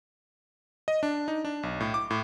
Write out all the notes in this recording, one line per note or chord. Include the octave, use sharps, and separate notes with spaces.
D#5
D4
D#4
D4
B1
A2
D6
A2